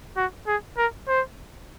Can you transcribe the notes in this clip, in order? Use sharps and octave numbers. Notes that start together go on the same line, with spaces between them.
F#4
G#4
A#4
C5